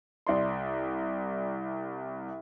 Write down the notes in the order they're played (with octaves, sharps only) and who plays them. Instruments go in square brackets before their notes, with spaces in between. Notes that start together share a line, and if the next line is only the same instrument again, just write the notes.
[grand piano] C2 D5 C6